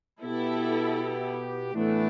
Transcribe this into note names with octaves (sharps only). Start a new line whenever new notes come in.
B2 B3 E4 G4 A4
A2 E3 A3 B3 D4